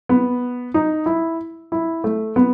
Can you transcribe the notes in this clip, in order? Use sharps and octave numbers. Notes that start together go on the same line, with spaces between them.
B3
D#4
E4
E4
A3
B3